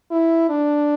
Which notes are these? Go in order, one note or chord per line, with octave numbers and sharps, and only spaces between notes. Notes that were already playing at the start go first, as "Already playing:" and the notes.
E4
D4